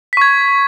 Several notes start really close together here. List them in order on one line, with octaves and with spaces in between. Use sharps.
B6 C#6 G#6